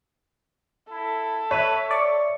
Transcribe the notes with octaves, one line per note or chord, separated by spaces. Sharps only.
E4 A4
B4 C#5 E5
D5 C#6